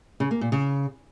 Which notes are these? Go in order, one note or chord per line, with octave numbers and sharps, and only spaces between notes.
C#3
A#3
A#2
C#3